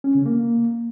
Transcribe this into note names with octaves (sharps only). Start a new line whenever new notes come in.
C#4
C#3
A#3